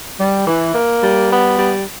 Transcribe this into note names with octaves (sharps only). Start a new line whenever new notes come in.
G3
E3
A#3
G3
B3
G3